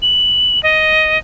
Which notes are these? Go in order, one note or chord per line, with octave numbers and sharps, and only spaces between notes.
F#7
D#5